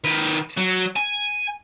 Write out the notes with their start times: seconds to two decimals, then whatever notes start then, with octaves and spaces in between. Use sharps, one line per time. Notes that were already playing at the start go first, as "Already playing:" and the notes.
0.04 D#3 B4
0.58 F#3
0.96 G#5